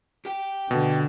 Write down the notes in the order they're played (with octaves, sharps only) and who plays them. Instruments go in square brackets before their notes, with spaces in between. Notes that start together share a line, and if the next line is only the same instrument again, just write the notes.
[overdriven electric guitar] G4 G5
[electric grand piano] B2 [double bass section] D3